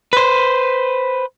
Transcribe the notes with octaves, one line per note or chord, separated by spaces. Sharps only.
B4 C5